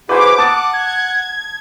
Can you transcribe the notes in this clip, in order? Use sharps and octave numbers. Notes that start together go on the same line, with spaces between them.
E4 F#4 G#4 B4 C5 D6
F#5 A5 D#6 A6
G#6